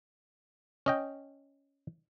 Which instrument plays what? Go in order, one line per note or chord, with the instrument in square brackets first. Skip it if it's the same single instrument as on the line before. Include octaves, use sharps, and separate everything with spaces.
[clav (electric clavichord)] C#4 D#5 G5